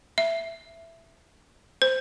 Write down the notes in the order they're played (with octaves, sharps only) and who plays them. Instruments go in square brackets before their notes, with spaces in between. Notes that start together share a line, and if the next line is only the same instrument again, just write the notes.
[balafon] E5
C5